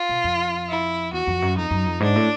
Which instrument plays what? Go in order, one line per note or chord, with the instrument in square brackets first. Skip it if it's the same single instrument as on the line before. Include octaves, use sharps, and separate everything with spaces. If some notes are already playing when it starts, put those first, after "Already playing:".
Already playing: [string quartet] F4
[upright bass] B2
F2
[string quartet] E4
[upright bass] E2 [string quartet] F#4
[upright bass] F2
F#2
[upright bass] F2 [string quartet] D#4
[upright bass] F#2
F2
[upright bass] G#2 [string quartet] D4
[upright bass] A2